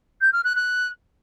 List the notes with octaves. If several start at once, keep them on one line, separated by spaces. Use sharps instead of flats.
G6
F6
F#6
F#6